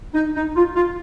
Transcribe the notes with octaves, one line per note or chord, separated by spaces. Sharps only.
D#4
D#4
F4
F4